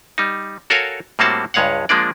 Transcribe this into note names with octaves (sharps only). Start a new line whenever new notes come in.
G3 D#4
F#4 A4 A#4 C#5 F5 G#5
A2 G3 A#3 C4 F#4 A5
C#2 G2 G#3 C#5 F5 F#5
F3 G#3 A#3 D4 D5